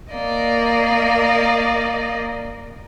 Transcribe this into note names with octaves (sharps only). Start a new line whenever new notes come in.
A#3 D5 D#5